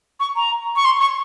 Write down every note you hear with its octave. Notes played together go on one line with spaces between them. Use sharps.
C#6
A#5
C#6
C6
C#6